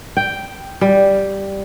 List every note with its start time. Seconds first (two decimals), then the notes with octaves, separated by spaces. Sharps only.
0.17 G5
0.81 G3